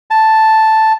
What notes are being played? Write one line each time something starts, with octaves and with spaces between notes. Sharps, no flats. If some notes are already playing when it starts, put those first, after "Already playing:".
A5